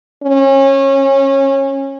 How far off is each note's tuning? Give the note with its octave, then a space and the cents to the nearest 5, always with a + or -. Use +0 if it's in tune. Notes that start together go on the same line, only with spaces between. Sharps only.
C#4 -25